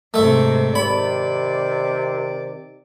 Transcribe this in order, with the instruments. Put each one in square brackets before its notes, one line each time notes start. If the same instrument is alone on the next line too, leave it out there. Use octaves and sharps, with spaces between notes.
[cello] G#2 C3 [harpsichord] A3 E5
[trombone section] C3 D#3 [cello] D5 [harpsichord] B5